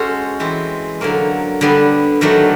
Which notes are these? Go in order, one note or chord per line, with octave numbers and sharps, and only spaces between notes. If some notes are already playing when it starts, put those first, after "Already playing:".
Already playing: G#3 C#4 F#4 A4 C5
E3 G#3 C4
D3 F#3 A#3
D3 G3 B3 D4
D#3 F#3 A3 D4